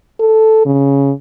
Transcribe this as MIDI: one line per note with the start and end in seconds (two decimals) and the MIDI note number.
0.20 0.62 69
0.65 1.12 49